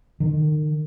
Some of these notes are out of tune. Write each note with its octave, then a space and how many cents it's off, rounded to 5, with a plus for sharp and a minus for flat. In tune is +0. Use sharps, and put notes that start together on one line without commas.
D#3 -35